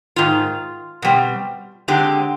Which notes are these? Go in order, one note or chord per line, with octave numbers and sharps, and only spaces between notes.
G#2 D#3 F4
B2 G3 C4
D3 G#3 C4 G4